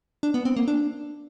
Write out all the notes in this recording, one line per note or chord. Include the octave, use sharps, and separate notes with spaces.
D4
B3
C4
A#3
D4